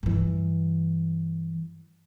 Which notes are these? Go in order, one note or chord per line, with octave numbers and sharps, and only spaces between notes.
G2 E3